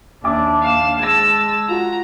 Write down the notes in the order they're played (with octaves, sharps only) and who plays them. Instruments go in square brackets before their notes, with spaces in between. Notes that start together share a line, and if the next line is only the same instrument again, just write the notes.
[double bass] D#2 D4 [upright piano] E5 G#5 D6
[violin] F5 E7
[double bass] G#3 [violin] A5 E6 [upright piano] G#6 A#6
[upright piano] F4 F#4 [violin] A#5